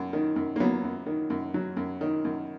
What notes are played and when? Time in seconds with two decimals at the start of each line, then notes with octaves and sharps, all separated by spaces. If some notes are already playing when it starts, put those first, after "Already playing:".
Already playing: F#2
0.13 D#3
0.36 F#2
0.56 A#3
0.60 F#3 B3
0.84 F#2
1.06 D#3
1.30 F#2
1.54 F#3
1.77 F#2
2.01 D#3
2.25 F#2